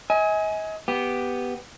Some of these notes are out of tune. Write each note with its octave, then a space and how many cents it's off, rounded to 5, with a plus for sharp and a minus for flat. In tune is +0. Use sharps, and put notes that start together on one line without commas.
D#5 +40 G#5 +0
B3 +0 G4 +0